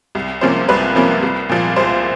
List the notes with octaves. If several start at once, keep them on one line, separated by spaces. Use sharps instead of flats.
C2
C3 F3 A#3 C#4 C5
C2 B4
C3 F3 A#3 C#4
C2
A#2 F3
C2 C5